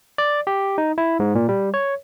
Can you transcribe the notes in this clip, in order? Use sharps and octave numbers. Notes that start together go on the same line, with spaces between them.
D5
G4
D#4
E4
G#2
A#2
G3
C#5